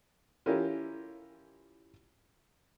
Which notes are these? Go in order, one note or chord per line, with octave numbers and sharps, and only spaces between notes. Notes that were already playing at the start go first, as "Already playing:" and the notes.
E3 C#4 F4 G4 A#4